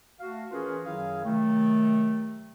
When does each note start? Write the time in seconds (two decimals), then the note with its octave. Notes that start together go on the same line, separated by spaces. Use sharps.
0.20 A3 F#4 F5
0.51 E3 C#4 F4 G#4 A#4 B4
0.85 F#2 D#3 F#3 E4 G#4 F5
1.25 C3 D#3 F#3 A3